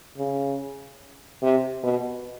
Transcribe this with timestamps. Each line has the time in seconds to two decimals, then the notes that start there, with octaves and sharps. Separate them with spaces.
0.18 C#3
1.42 C3
1.83 B2